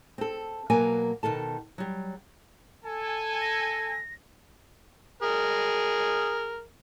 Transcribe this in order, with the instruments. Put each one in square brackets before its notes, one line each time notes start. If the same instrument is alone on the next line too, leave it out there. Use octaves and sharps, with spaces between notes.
[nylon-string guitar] C4 A4
B2 F#3 A#3 A#4 D5 G#5
B2 D#3 A4 A5
F#3 G3
[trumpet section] A4 G#5
[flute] A#6
[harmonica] G#4 A#4